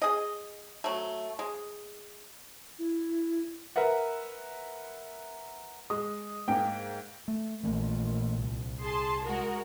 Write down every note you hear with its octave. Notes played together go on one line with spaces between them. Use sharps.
G#4 D#5
F#3 A3
G#3
E4
A#4 B4 E5 F#5
G#3 D#6
G#2 A#3 G5
A3
A#1 E3 A3 A#3
C2
G#4 A5 C6
G#3 F#4 A#4